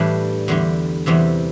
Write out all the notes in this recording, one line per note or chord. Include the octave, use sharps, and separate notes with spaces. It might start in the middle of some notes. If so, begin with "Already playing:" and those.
Already playing: A2 E3 G3 D4
E2 D3 G3
E2 C3 E3 G3